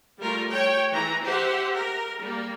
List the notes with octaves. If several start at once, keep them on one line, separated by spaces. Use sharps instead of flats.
G3 A3 F4 A#4
C#5 G5
E3 A#5
G4 C5 E5 F#5
A#4
G3 A#3